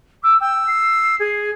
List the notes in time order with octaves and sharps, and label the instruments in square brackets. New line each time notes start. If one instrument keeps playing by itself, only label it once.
[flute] D6 [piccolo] E6
[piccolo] G5 [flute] E6
[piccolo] C7
[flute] G#4